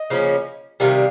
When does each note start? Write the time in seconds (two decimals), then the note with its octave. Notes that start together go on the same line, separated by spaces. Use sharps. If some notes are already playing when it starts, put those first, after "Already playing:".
Already playing: D#5
0.10 C#3 F3 A#3 C#4
0.80 C3 D#3 G3 F5